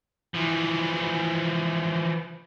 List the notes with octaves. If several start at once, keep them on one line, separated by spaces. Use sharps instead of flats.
E3 F3